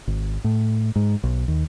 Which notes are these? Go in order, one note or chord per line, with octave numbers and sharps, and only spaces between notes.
G#1
A2
G#2
B1
D#2